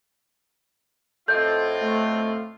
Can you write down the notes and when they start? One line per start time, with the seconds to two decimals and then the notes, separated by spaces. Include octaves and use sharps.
1.28 A2 C4 F4 A4 D#5 E5 G6
1.82 A3